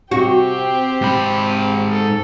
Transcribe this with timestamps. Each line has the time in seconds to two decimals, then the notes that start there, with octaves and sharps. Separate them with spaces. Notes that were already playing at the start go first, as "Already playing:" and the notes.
0.11 C3 C4 F#4 G4
1.01 G#2 C3 B5
1.90 A4